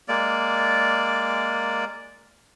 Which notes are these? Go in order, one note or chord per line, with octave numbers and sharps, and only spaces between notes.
G#3 A#3 D5